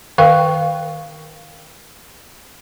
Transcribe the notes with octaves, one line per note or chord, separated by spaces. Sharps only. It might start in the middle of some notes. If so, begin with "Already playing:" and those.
D#3 A#4 F5 G5